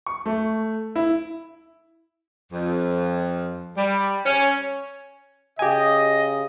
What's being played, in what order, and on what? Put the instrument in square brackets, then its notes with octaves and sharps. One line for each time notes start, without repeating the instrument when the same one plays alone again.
[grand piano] C#6
A3
E4
[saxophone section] F2
G3
C#4
[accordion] C#3 [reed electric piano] G4 G#5 [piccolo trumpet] D#5